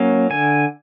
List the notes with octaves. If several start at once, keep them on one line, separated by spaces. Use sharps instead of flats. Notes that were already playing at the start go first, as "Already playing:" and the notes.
Already playing: F#3 A#3 C#4
D3 G#5